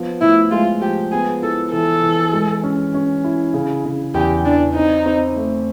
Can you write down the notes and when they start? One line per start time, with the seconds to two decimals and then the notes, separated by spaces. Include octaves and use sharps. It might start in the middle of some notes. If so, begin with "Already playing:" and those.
Already playing: F3 B3
0.21 A2 E4
0.51 G#3 F4
0.81 F3 G4
1.12 B3 G#4
1.42 E4 A4
1.73 E3 A4
2.03 E3
2.33 G#3
2.64 C#4
2.94 C#4
3.24 E4
3.54 C#3
3.85 C#3
4.14 E2 G4
4.45 E3 D4
4.75 C4 D#4
5.06 C4
5.36 A3